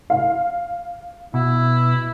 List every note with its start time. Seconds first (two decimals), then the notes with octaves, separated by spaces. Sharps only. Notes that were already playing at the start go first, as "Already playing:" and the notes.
0.10 F5
1.34 B2 E4